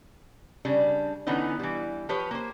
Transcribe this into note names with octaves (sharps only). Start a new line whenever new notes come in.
C#3 G3 D4
D3 E3 B3 C#4 D#4
E3 G3
F3 G4 B4 C#5
A#3 C5